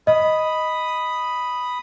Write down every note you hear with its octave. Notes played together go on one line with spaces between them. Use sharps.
D#5 B5 D#6